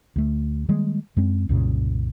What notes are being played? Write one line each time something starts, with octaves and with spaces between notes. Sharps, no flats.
D2 A3
D#3 G3 G#3 A#3
F#2 G#3 C4
C2 F#2 A#2 C#3